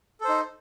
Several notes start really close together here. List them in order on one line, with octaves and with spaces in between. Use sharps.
A4 C5 D#4